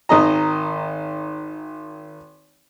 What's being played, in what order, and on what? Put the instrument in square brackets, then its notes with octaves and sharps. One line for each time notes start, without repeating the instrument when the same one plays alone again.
[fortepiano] G#1 D#3 D#5 A#5